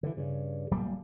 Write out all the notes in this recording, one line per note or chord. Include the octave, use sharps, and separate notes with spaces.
D3 E3
G2 C#3
D1 F#3 G3 A#3